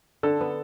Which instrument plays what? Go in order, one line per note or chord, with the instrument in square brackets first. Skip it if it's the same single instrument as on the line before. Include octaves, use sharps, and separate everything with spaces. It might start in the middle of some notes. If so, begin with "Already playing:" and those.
[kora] D3 [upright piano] A4
[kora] B3